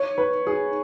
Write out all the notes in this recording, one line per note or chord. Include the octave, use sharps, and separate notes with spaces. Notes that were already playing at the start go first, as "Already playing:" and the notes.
Already playing: C#5
B4
G#4